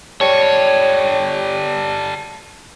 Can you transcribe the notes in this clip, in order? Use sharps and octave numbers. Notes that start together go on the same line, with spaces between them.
G3 G4 A4 C#5